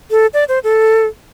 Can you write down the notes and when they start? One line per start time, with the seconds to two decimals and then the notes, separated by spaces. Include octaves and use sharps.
0.11 A4
0.34 D5
0.49 C5
0.64 A4